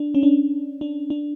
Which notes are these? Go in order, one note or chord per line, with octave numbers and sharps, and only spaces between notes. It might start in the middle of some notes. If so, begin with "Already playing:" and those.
Already playing: D4
C#4
D4
D4
D4